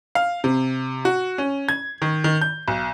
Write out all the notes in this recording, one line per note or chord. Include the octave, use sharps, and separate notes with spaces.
F5
C3
F#4
C#4
G#6
D#3
D#3
G6
B1